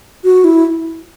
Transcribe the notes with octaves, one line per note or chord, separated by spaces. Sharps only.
F#4
E4